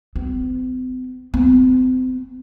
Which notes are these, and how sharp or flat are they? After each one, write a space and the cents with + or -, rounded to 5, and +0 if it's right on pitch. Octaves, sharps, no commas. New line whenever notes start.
C4 -45
C4 -40